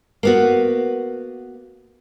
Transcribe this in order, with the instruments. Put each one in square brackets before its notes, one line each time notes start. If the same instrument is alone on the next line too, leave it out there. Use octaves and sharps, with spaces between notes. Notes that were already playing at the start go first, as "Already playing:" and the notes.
[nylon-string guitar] A#3 B3 F#4